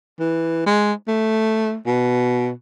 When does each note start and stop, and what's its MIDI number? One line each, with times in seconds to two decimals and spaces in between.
0.20 0.63 52
0.66 0.93 56
1.08 1.76 57
1.86 2.51 47